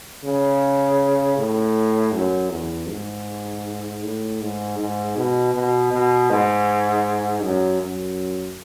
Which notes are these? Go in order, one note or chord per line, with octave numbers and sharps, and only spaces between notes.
C#3
A2
F#2
E2
G#2
A2
G#2
G#2
B2
B2
B2
G#2
F#2
F#2